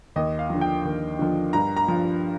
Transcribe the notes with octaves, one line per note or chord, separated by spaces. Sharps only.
D#2 D#5
F5
D3 F3
G5
D#2
D3 F3
G2 A#5
A#5
F3